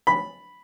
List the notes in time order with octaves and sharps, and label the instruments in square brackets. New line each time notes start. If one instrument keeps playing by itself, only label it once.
[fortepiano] B5